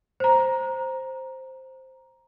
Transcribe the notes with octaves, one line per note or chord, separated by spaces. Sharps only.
C5 A#5